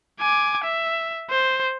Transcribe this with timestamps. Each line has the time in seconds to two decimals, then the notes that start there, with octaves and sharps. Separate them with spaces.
0.20 G#5 D6
0.64 E5
1.31 C5